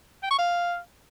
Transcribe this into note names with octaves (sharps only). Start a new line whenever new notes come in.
G5
C#6
F5